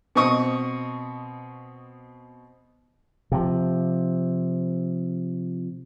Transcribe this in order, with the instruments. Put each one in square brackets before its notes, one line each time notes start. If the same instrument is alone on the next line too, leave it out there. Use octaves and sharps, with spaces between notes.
[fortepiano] B2 C4 D#5 C#6 D#6
[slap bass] C3 F3